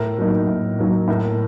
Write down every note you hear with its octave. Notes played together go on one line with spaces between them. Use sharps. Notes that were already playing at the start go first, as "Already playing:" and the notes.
Already playing: A2 A#4
F#3 A#3 D#4
A2
F#3 A#3 D#4
A2 A#4